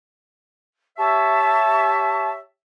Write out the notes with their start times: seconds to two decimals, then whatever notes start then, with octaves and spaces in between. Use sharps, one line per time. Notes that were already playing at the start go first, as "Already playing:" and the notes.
0.98 G4 C#5 E5 A5 C#6